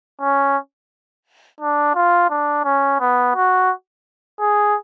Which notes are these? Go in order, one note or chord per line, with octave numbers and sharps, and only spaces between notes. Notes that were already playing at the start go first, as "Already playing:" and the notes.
C#4
D4
F4
D4
C#4
B3
F#4
G#4